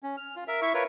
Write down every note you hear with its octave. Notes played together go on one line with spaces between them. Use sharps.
C#4
F6
F4
A#4 E5
E4 E5 C#6
F4 A#4 B4 C#5